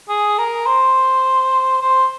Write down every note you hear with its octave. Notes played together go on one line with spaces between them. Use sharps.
G#4
A#4
C5
C5